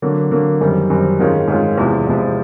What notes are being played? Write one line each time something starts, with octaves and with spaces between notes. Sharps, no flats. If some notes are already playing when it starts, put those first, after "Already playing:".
D3 F#3 A#3
D3 F#3 A#3
F#2 D#3 G3 C4
F#2 D#3 G3 C4
G#2 D#3 G#3 C#4 F4
G#2 D#3 G#3 C#4 F4
E2 C3 F3 G#3
E2 C3 F3 G#3